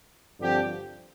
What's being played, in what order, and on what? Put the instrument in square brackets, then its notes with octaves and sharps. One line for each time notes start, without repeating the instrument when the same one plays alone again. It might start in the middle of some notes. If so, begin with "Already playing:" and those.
[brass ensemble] G2 D3 F3 C4 G4